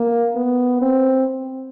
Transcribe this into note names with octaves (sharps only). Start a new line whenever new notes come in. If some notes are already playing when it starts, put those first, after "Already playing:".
Already playing: A#3
B3
C4